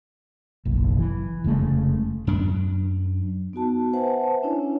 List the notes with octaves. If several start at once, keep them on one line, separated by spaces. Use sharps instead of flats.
F#1 B1
E3
F1 C#3 G#3 A3
F#2 D4
B3 D#4 F#4 A5
B4 C5 E5 F#5 G#5 A5
C#4 D4 E4 C#5 G#5